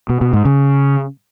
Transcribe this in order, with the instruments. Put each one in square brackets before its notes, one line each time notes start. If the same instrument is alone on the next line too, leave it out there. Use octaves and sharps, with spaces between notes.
[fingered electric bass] B2
B2
G#2
C#3